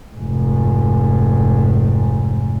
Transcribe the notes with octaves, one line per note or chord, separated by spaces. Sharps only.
F1 G#2